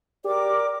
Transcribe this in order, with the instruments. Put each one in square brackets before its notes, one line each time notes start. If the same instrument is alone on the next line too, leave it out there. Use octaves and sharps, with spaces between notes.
[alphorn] G4 [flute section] A#4 D6 [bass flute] D5